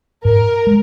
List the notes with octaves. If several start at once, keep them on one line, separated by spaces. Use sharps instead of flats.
G#2 A#4
G#3